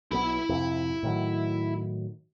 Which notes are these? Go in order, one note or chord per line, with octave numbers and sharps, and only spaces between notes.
B1 B3 E4 B5
F2 G#2 C3
A2 D#3 F#3